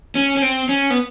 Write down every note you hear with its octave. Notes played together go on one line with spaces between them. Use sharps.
C#4
C#4
C4
C#4
B3